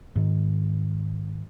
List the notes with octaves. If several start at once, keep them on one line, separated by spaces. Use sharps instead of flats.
G#2 D#3